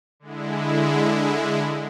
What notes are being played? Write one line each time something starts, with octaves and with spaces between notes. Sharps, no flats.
D3 G#3 E4